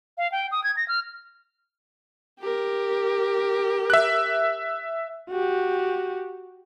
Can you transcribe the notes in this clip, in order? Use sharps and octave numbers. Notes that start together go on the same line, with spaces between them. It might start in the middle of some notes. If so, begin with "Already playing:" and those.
F5
G5
D#6
G#6
A#6
F6
G4 A#4
E5 F#6
F#4 G4